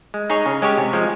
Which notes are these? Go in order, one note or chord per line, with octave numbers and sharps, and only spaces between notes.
G#3
D#4 G#4 C#5
C#3
G#3 C#4 G4 C#5
C3
F3 G#3